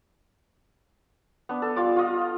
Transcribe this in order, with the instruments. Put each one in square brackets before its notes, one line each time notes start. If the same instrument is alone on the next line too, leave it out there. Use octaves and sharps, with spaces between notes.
[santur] B3 D4
A4
G3 F4 D5 D6
F4 D#5